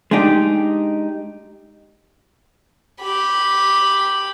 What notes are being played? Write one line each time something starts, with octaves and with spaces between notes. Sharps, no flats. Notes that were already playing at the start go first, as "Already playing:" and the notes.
G#3 D4 D#4 G4
G4 B5